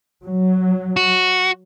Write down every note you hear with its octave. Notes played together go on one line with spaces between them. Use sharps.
F#3
F#4